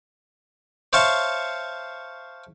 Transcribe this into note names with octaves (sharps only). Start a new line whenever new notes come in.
C5 C#5 E5 F5 A5 C#6